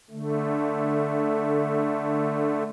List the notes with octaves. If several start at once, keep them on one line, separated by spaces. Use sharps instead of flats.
D3 A3